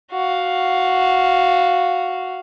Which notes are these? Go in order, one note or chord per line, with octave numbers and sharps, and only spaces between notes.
F#4 F5